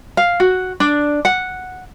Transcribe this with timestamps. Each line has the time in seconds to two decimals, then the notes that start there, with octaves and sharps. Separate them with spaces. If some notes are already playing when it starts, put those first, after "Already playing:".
0.17 F5
0.40 F#4
0.80 D4
1.25 F#5